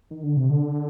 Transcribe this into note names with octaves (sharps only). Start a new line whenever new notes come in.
D#3
D3
C3
D3